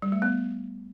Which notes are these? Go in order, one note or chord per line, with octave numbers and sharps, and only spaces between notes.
G3
A3
B3